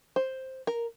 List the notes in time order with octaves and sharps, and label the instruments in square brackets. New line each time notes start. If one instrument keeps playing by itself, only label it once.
[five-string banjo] C5
A#4